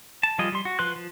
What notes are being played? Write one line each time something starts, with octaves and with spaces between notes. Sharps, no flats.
A5
F3 G3 F4 G#4 D#5
G3 C6
F#4
F3 B4 C6 F#6
F3